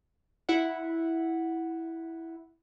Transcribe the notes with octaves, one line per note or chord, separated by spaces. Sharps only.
E4 E5 F#5